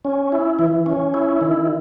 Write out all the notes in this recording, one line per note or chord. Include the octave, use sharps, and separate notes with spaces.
C#4
E4
E3
C#4
E4
D#3